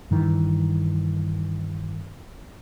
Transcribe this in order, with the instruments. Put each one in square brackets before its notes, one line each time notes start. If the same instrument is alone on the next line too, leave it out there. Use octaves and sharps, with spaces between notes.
[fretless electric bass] G2 D#3 E3